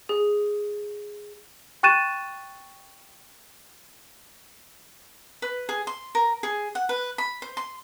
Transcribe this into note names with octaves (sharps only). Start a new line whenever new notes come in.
G#4
G5 C#6 F#6 A6 D#7 E7
B4
G#4
C6
A#4
G#4
F#5
B4
B5
C5
C6